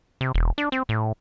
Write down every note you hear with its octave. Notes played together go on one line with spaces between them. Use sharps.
C3
E1
D4
C4
A2